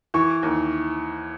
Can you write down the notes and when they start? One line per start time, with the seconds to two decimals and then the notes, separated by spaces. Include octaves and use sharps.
0.14 E3 C#6
0.43 D#2